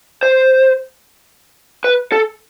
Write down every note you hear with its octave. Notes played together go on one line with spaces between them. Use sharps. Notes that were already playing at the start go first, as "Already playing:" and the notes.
C5
B4
A4